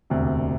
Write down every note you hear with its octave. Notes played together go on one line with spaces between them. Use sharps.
E1 D2 C3